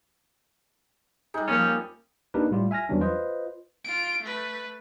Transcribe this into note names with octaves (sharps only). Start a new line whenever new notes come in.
G3 D#4 G#4 F#6
F2 F3 A#3 C#4 A6
A#3 D4 D#4 G4 A#4 B4
A2 G3 E4 F4 G4
E5 G#5 F6 A#6
E2 E3 F#3 G3 C#4 D4
F4 B4 C5 D#5
F4 D7
A3 B4